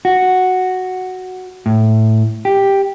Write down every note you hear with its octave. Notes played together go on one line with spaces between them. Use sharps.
F#4
A2
G4